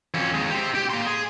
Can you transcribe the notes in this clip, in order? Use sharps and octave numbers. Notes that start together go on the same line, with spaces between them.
F2 C#4
D#2 G#3
G4 C5
G4 G5
A#3 C6
G#4